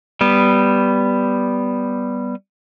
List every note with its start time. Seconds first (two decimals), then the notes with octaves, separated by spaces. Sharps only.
0.21 G3 B3